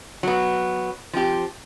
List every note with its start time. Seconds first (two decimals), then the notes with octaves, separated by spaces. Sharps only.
0.23 F#3 B3
1.13 F3 C4 G4